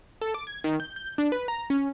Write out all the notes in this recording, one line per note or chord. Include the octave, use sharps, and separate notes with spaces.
A4
D6
G#6
D#3
G6
G6
D4
B4
A#5
C#4